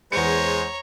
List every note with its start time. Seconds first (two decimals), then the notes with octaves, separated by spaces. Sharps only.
0.12 E2 G#3 C5 C#5 A#5 C#7